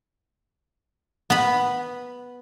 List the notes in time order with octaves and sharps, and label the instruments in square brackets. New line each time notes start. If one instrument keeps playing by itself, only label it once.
[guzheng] B3 B5